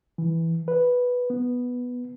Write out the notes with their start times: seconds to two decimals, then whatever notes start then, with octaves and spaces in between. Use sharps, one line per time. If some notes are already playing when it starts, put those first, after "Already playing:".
0.18 E3
0.68 B4
1.30 B3